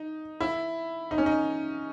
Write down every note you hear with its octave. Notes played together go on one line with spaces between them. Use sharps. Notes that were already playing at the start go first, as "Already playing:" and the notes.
Already playing: D#4
E4
D#4
C#4
D#4